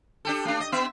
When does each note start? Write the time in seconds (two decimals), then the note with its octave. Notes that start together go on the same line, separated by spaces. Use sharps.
0.25 D4 G4 A4
0.45 A3 D4
0.60 D#5
0.72 B3 E5